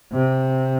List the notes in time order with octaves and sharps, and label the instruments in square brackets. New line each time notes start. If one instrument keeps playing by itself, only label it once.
[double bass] C3